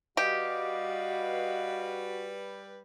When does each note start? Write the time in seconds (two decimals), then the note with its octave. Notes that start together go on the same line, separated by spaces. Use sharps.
0.17 G3 F#4 G4 B4 D#5 F5